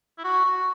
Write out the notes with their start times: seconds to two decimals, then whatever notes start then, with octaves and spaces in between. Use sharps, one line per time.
0.18 E4
0.24 F#4
0.45 F#4